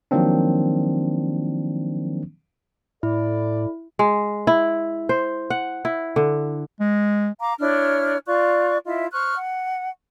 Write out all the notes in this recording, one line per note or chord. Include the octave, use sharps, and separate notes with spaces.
D#3 F3 F#3 A#3 C4 D4
A2 E4 A4 D5
G#3
E4
C5
F#5
E4
D3
G#3
F5 A#5 D6
D4 E4 C#5 F6
F4 D5 C#6 F#6
E4 F4 D#5 E5
C5 C#6 F6 F#6
F#5